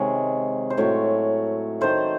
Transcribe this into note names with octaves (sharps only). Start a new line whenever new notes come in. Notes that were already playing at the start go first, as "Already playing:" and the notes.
Already playing: C3 D#3 G#3 C#5
C5
A2 F#3 A3 C#5
D#3 A3 C5